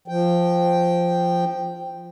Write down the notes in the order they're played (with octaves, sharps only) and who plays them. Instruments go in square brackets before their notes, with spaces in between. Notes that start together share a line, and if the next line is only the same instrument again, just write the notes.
[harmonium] F3 G5